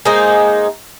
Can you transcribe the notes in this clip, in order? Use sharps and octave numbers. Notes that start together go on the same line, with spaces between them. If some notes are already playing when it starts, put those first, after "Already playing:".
G#3 A#3 D#4 C5